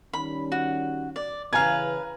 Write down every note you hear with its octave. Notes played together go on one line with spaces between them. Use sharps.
D#3 G3 C#4 B5
F#4
D5
C#3 E3 B4 F5 G#5 A#5 G#6